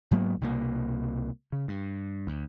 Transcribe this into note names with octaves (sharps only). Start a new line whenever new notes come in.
G#2 F#3 A#3 B3
C2 B2 G3 A#3
C#3
G2
D2